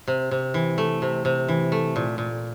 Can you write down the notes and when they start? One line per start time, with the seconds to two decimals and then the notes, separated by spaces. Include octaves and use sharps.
0.08 C3
0.31 C3
0.54 E3
0.78 A3
1.02 C3
1.25 C3
1.48 E3
1.72 A3
1.96 A#2
2.18 A#2